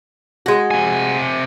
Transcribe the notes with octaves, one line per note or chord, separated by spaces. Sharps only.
G#3 F#4
C3 G#5